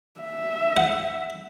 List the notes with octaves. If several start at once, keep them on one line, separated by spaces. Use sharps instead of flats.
E5
F#5